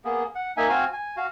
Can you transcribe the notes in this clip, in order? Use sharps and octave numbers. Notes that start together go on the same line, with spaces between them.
A#3 B3 G#4
F#5
A#3 D#4 E5 G#5
C4 F#4 F5 G#5
G#5
F#4 F5